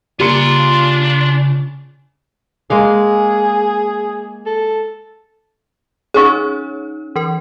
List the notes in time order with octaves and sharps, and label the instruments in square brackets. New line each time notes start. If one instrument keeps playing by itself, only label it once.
[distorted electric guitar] C#3 [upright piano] G3 A#3 C#7 [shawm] D4 [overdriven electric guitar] F4 C6
[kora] G#3 A#3 F5 [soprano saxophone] G#4
[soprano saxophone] A4
[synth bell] C#4 D#4 C#5 [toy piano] G#4 C#6
[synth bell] E3 A#4